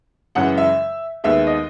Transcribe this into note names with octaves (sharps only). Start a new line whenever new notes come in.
F#2 C#3 E3 G#3 F#5
E5
D#2 D#3 G#3 B3 E5
D#5